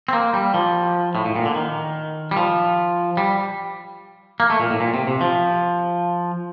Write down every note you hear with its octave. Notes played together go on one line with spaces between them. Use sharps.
C4
A#3
G3
F3
A2
A2
A#2
D3
D#3
G3
F3
G3
A#3
A3
A#2
A2
A#2
C3
C3
F3